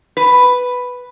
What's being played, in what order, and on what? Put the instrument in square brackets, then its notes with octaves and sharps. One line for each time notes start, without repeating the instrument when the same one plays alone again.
[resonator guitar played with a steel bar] B4